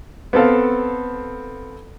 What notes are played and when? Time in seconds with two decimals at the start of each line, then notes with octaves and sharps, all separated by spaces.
0.33 B3 C4 A4 F5